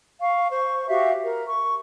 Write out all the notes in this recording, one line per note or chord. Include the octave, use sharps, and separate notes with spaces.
F5 C#6
C5 C#6
F#4 G4 E5 F5
A#4
C#6